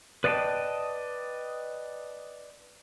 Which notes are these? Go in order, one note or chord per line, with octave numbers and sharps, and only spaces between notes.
B4 D5 D#5 F5 G5 A5